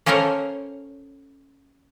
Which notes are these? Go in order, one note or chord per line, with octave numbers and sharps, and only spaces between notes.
A#3 C#4 A4 A#4 C5 C#5